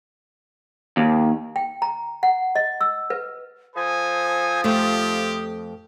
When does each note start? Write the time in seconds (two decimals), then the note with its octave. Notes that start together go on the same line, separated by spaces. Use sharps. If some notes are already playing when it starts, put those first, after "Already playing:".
0.97 D#2
1.56 G5
1.82 A#5
2.23 F#5
2.55 D#5
2.81 E6
3.10 B4
3.76 F3 A4 C5 G#5 D#6
4.64 F2 A3 C4 F4 G4